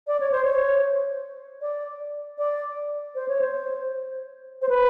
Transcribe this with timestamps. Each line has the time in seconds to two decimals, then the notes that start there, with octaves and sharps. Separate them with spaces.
0.07 D5
0.20 C#5
0.32 C5
0.44 C#5
1.61 D5
2.38 D5
3.15 C5
3.28 C#5
3.41 C5
4.62 C5
4.69 B4